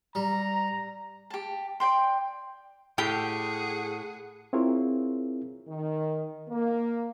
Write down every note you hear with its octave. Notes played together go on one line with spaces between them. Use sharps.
G3 A#5
G4 A5
D5 G5 C6
A2 G4 G#4 F#5 G5
C4 E4 F4 G#4 A#4 C#5
D#3
A#3